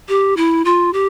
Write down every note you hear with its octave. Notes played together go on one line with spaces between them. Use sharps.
G4
E4
F4
G4